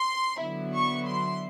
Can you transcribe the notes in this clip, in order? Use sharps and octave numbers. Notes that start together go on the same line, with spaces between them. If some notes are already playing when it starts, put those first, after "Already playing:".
Already playing: C6
D3 F#3 B3 E4
C#6
C6